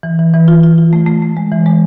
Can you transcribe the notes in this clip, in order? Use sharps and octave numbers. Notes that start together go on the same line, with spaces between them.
E3
E3
E3
F4
F4
F4
A3
A3
A3
G#3
E3
G#3